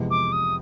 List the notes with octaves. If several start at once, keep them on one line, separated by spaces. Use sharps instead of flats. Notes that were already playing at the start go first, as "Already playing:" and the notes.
Already playing: F2 C3 E3 G#3 B3
D6
D#6